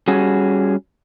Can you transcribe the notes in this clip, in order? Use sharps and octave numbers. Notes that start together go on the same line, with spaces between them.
G3 C#4 F#4 G#4